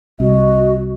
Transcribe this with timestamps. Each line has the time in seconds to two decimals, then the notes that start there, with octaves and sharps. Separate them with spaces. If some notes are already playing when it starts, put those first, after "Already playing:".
0.20 C2 F#4 D#5